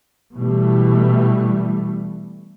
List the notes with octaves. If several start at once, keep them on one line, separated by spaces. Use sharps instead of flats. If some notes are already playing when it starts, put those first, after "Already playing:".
B2 E3 G3 A3